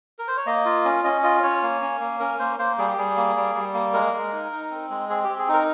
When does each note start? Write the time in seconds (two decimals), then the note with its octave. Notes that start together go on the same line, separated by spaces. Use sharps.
0.19 A#4
0.28 C5
0.37 C#5
0.46 A#3 D#5
0.65 F4
0.85 C#4
1.04 C#4 D#5
1.23 F4 D#5
1.43 C#4 C#5
1.62 A#3
1.81 C#4
2.00 A#3
2.20 C#4 A#4
2.39 A#3 C5
2.59 A#3 C5
2.78 G3 G#4
2.88 G4
2.97 G3 G#4
3.17 A#3
3.36 G3
3.55 G3
3.74 A#3
3.93 G#3 A#4
4.13 G#3
4.33 D#4
4.52 D#4
4.71 C4
4.90 G#3
5.10 C4 G#4
5.24 C4 G4
5.38 G#4
5.48 D#4
5.53 A#4